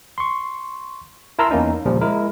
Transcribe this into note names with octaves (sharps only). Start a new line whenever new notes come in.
C6 C#6
E4 A#4 A5 A#5 C6 E6
E2 A#3 C#4 D#4
A#2 C#3 F3 G3
G#3 E4 A#4